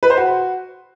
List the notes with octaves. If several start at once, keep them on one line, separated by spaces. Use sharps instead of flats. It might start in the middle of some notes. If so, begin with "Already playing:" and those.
B4
C5
F#4